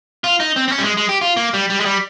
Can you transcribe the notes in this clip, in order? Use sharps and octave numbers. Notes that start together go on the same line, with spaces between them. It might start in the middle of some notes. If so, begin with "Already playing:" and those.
F4
D#4
C4
C4
C#4
G3
G#3
G#3
G4
F4
A#3
G3
G3
G#3
G3